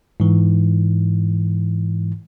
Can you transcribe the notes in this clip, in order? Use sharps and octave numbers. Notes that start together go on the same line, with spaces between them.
G#2 E3